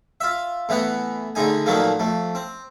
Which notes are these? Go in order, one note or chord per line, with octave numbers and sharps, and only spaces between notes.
F4 E5
A2 E3 B3 F#5
A2 D3 G#3 D#4 G#5
A#2 D#3 F3 F#3 A3 A#3
F2 A3
C4